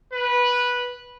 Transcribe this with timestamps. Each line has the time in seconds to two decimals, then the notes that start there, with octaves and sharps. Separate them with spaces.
0.13 B4